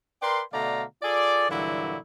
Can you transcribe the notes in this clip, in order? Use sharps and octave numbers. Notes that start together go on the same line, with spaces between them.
A#4 B4 D5 G5 C6
B2 D3 A3 D5 F5 A#5
F4 G#4 A4 D5
G2 A#2 D3 E3 F#3 E4